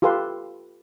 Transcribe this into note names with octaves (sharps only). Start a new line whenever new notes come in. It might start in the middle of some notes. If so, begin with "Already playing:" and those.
F4 G4 A4 B4 F5 C6